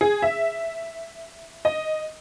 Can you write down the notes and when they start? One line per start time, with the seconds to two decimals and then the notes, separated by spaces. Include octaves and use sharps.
0.01 G#4
0.22 E5
1.65 D#5